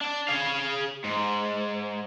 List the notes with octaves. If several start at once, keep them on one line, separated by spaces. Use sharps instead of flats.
D4
G#4 F5
G#2